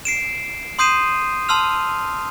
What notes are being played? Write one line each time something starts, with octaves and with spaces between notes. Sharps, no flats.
C7 D7 E7
C6 D#6 G6 C7 D#7 E7
A5 C6 E6 F6 F7